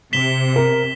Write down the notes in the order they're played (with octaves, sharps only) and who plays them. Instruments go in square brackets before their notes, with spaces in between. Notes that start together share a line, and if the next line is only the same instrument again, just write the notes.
[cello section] C3 [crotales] B6 E7 G7
[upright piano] A#4